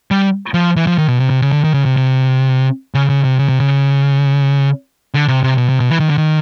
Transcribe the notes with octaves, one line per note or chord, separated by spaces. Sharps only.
G3
F3
E3
F3
D#3
B2
C3
C3
C#3
D3
D#3
C#3
C3
C3
C#3
C#3
C3
C#3
C3
C#3
D3
C3
C3
B2
C3
B2
E3
D#3
D3
D#3